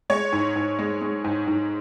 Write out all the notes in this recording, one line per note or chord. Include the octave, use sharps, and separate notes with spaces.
G#3 C#5
G#2
G#2
G#3
G#3
G#2
G#2